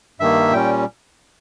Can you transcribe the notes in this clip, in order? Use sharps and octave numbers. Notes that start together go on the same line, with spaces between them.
G2 D#3 A#3 E5
A#2 G3 C#4 G5